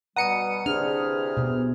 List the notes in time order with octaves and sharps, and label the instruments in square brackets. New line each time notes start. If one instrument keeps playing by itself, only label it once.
[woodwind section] B2 G3 [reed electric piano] F#5 A#5 [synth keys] D#6 C#7 D#7
[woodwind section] C3 E3 G#4 [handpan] D4 [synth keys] F6
[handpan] B2 B3